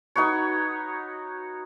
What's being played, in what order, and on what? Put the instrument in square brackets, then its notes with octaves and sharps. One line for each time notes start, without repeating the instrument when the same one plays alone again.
[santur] D#4 F#4 B4 C#5